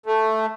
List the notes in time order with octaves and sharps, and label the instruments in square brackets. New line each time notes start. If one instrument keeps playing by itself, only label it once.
[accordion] A3